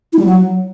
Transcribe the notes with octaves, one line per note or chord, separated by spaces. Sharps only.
E4
G3
F#3